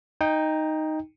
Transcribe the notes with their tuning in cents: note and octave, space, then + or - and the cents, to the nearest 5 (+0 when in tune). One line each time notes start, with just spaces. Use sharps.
D#4 +0 G5 +20